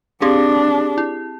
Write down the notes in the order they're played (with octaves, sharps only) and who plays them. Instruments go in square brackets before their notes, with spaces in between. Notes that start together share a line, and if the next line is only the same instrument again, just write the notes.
[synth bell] C4 G4 G#4 [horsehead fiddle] D4
[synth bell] E4